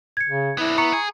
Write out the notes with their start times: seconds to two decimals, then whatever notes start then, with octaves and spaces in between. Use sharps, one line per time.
0.17 G#6 C#7
0.29 C#3
0.58 B3 D4 E4
0.78 B3 A#5 C#6 C#7
0.93 G#4